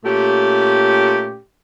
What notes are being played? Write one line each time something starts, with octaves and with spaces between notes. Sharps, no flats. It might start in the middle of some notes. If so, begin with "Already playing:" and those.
A#2 A3 C#4 G4